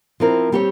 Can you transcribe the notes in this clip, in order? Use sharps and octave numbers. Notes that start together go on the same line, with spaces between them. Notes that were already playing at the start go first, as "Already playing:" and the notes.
F3 C4 E4 A#4
G3 C4 G4 C#5